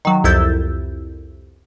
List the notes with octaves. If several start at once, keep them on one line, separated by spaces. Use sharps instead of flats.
D#3 F#3
C2 F2 E4 E6 G6 A6